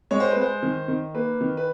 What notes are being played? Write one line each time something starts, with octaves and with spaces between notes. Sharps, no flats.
G#3 C#5
C5
G#3 B4
C5
D#3
D#3
A#3 B4
D#3
B4